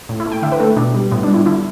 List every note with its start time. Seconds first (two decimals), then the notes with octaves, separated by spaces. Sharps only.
0.09 A2
0.20 E4
0.26 A3
0.32 G5
0.42 D3 E5
0.52 B4
0.60 A3 A4
0.77 B2 D4
0.95 G3
1.11 A2 B3
1.23 G3 D4
1.34 E4
1.46 D3 E4